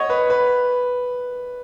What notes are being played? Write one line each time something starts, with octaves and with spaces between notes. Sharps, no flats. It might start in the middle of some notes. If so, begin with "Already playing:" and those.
Already playing: C#5 D#5 F#5
B4
B4